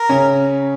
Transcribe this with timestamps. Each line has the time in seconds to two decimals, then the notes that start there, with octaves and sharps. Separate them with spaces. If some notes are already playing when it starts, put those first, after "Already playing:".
Already playing: A#4
0.09 C#3 C#4